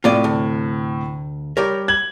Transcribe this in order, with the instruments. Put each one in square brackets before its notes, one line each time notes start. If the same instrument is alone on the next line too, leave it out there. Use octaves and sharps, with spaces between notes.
[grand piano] A2 C3 [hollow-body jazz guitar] F4 D5 D#5
[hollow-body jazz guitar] D2
[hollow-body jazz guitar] G3 G4 A#4 [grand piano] C#5
[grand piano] G#6 F#7